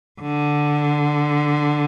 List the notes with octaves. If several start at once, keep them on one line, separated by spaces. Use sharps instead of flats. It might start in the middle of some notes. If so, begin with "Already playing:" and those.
D3